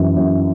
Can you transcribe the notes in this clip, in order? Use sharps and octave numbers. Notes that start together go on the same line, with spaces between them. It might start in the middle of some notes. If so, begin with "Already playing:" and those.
Already playing: F#2 E3
F#2